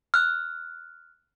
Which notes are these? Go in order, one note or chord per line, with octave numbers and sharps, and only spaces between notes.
F6 F#6